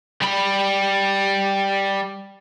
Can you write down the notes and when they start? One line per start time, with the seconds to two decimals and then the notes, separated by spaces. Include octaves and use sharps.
0.22 G3 B5